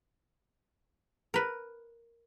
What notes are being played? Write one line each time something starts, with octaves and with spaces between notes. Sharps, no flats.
A#4 B4